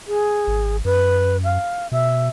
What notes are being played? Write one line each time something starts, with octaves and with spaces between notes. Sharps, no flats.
G#4
G#1
F#2 B4
F5
B2 E5